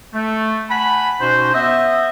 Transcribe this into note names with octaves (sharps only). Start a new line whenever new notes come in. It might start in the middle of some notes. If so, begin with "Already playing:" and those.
A3
F#5 G#5 A5 B5
B2 C#4 D#4 F#4 C5
B3 C5 D#5 E5